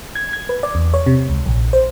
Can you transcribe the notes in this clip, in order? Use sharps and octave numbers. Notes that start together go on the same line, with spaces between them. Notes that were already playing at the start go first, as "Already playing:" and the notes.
G#6
G#6
B4
D5
E2
C#5
C3
C#2
A#1
C5